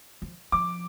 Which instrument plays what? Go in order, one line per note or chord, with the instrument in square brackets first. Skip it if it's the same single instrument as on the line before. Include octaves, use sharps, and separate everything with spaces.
[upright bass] F3
[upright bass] F3 [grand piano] D6